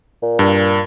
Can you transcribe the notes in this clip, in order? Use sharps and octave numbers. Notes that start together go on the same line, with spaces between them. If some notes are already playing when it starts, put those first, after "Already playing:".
A#2
G2